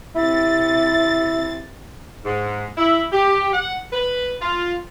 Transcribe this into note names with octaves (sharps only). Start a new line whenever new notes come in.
C3 E4 A6
G#2
E4
G4
F#5
B4
F4